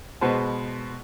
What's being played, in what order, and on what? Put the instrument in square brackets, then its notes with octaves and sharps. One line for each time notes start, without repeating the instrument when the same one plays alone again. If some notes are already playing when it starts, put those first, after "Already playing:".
[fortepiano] B2 G#3 B4 C5 A5